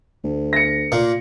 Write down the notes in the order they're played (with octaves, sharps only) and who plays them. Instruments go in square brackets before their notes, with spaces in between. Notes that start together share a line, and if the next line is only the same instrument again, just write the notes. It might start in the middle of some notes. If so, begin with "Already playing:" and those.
[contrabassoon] D2
[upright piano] A#6 C#7
[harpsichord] A#2 A#3